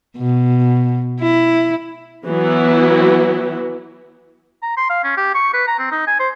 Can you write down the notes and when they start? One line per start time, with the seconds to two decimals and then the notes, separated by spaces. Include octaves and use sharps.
0.17 B2
1.20 E4
2.26 E3 F#3 B3 E4 F#4
4.62 A#5
4.77 C6
4.90 F5
5.04 C#4
5.17 G4
5.34 C#6
5.53 B4
5.67 A#5
5.79 C4
5.92 D#4
6.07 G#5
6.20 C5